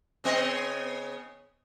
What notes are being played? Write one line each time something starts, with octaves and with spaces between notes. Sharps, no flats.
C#3 B3 D#5